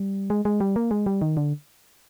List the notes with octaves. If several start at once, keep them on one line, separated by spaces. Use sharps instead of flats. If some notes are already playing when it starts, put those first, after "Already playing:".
Already playing: G3
G#3
G#3
G3
A#3
G#3
G3
D#3
D3